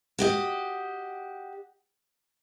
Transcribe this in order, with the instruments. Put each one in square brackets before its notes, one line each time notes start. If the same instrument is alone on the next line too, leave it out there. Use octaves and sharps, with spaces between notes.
[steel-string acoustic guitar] F#4 G4 D#5